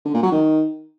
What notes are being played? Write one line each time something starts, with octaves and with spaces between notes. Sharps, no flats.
D3
A#2
F#3
D#3